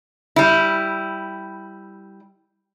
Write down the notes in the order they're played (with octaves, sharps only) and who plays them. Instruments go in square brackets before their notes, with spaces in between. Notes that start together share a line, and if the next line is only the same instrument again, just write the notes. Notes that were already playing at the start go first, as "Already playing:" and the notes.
[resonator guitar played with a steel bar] G3 E4